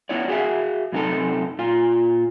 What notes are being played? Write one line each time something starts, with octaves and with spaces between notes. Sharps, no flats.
B3 E4 C#5 D5
F#4 G#4 C#5 E5 F5
F#2 C3 D#4 F4 A4
A#2 F4